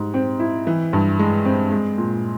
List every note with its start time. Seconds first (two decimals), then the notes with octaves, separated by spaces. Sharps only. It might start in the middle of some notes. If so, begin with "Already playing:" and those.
Already playing: G#2 G3
0.14 C4
0.39 E4
0.67 E3
0.93 G2
1.19 G#3
1.45 C4
1.71 G#3
1.98 A#2